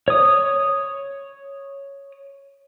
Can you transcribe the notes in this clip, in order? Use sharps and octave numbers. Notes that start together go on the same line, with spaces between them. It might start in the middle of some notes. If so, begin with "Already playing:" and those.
C#5 D#6